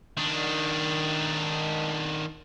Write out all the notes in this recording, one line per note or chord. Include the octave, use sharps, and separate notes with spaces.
D#3 D4